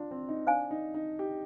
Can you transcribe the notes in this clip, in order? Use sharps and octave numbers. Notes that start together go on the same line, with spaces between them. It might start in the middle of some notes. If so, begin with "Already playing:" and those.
Already playing: D4 F4
C4
D#4
D4 C5 F5 G#5
D#4
D#4
G4